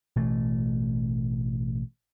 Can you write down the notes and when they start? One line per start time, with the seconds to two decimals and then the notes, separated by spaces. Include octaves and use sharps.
0.16 A1 B2 E3 A3